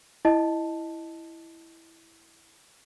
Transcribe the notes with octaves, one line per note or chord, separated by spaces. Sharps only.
E4 D#5 A5